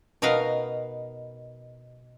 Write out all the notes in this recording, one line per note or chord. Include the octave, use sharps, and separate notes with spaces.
B2 D#4 A#4 B4 F5